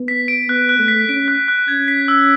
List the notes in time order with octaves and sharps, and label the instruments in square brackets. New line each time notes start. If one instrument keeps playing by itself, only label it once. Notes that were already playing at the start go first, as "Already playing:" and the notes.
Already playing: [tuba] B3
[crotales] B6
D7
[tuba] B3 [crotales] F#6
[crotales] F#6
[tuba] A3
[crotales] B6
[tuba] C#4 [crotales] D7
[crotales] F#6
F#6
[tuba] C#4 [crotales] G#6
[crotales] B6
E6